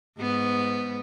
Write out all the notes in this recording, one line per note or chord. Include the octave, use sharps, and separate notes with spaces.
G#2 B3